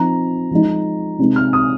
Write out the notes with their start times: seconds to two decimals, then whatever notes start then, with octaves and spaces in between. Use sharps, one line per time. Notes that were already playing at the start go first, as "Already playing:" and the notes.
Already playing: F3 C4 D#4 A#5
0.51 F3 G#3 D#4
1.19 C3 G#3 C4 D#4
1.36 F6
1.53 D#6